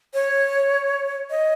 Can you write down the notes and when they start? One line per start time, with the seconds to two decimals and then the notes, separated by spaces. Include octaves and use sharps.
0.14 C#5
1.30 D#5